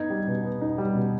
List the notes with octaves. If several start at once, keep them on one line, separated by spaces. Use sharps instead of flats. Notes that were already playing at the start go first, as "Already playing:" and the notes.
Already playing: B3 D#4 G#6
G3
B2
B3
D#4
G3
B2